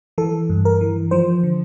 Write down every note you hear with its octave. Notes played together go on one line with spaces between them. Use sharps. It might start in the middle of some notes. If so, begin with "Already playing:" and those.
E3 A4
G2
A#4
E3
F3 C5
D3